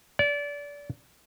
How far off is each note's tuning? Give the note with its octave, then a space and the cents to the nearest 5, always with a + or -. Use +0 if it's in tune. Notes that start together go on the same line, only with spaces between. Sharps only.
D5 -30